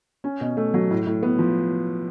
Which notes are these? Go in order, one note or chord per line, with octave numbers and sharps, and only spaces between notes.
C#4
B2
A3
F#3
A2
A2
B3
F3